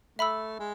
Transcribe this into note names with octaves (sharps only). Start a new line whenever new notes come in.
A3 E5 B5 E6
G#3